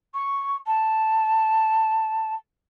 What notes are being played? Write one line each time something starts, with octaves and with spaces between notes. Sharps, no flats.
C#6
A5